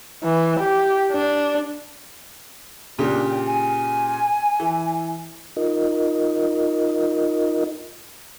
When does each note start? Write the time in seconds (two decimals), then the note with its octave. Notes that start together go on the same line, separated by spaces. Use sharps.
0.24 E3
0.60 G4
1.12 D4
2.98 A#2 C#3 D4 G4
3.30 G5
3.46 G#5
4.60 E3
5.57 D#4 F4 A#4 D#5